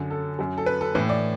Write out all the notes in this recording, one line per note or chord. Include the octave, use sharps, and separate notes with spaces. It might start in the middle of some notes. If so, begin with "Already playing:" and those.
Already playing: F#2 D3 F#3
A4
F#2 F#3
A4
B4
A4
A2 E3 B4
D5